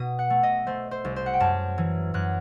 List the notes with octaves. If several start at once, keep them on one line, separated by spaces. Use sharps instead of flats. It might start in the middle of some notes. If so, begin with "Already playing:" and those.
Already playing: B2 D#6
F#5
A3
D#5
A3 C5
C5
C2
C5
F#5
G5
F#2 A5
E3
F#2 F#6